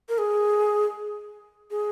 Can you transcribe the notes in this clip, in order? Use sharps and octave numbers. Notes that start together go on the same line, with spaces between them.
A#4
G#4
G#4